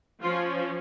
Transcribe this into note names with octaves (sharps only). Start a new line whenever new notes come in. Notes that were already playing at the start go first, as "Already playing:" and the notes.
F3 C#4 F4